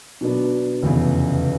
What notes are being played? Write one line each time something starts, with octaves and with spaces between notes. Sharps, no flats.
B2 F#3 B3 D4
F1 E2 C#3